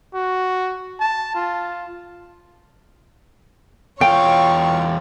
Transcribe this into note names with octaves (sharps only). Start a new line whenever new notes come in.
F#4
A5
F4
E2 F4 C#5 F5 G5 C#6